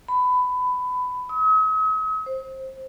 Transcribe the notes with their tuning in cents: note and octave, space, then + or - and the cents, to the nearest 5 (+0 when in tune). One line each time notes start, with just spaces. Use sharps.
B5 +20
D#6 +45
C5 +10